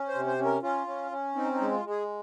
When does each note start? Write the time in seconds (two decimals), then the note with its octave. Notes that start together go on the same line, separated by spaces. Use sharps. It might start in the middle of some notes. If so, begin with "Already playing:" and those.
Already playing: C#4
0.08 C5
0.15 C3
0.27 C5
0.39 C#4
0.45 A#4
0.62 C#4 F4
0.87 C#4
1.11 C#4
1.35 C4 D#4
1.54 D#4
1.61 G#3
1.72 F4
1.84 G#3
1.90 G#4